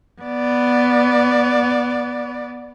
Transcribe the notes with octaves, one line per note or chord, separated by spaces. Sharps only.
B3 D5